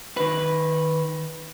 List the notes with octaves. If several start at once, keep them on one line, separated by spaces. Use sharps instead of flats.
D#3 B4